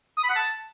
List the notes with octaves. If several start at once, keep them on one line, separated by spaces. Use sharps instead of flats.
D#6
B5
F#5
A5